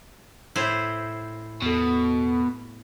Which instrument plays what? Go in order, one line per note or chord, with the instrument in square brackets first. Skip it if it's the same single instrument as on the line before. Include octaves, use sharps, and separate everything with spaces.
[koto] A2 E4 C5
[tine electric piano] E2 A4 [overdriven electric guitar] B2